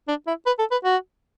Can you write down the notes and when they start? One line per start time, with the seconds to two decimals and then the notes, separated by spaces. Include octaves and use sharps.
0.08 D4
0.27 E4
0.46 B4
0.59 A4
0.71 B4
0.85 F#4